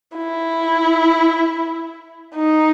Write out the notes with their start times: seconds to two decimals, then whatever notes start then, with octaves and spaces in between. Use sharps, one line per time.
0.17 E4
2.35 D#4